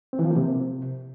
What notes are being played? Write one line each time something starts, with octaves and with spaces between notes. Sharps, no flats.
C4
E3
F3
A#3
C3